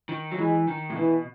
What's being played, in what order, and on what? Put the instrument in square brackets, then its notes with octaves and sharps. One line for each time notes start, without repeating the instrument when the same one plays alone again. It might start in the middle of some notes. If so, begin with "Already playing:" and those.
[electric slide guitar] D#3
F#3
[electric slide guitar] E3 [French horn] G#3
[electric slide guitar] D#3
A2
[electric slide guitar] B2 [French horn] E3